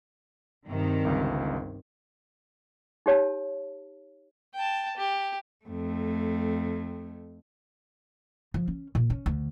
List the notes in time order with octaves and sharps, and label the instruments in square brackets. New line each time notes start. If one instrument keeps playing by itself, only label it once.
[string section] G2 C3 D#3
[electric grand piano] G1 C#2
[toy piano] D#4 G4 C#5 A5
[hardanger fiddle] G5 A5
G4
[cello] F2 A3
[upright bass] F3
C#4
A#2
C#4
D2